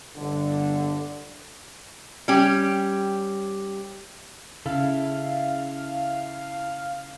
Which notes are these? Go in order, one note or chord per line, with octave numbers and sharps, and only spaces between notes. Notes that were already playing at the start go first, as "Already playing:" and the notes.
G1 D3
G3 C#4 G4
C#3 E4 A4 F5